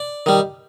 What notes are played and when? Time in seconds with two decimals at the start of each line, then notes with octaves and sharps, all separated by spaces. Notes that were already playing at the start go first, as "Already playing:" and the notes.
Already playing: D5
0.26 D#3 G3